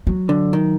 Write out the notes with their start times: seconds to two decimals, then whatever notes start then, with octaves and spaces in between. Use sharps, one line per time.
0.07 F#3
0.29 D3
0.53 D#3